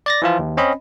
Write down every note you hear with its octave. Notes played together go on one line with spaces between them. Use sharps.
D5 A6 A#6
E3 F3 F4
D#2
C4 C#4 D#5 B5